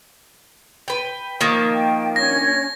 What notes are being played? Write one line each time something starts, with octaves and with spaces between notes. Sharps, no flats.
B4 G5
D#3 F3 A#3
G5
C#4 D4 G#6 A#6